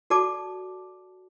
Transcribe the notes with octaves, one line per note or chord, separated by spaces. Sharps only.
F#4 A4 D5 A5 D6